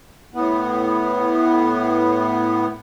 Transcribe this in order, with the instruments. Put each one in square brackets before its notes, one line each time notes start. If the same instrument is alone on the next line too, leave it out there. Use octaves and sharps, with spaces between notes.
[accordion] A2 B3